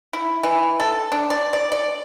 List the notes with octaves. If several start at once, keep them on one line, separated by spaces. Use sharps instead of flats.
E4
E3
A4
D4
D5
D5
D5